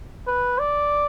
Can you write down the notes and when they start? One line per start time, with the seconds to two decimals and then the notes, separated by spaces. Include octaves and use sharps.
0.27 B4
0.59 D5